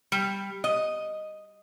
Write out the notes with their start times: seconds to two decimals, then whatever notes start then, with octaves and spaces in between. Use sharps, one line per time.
0.12 G3
0.64 D#5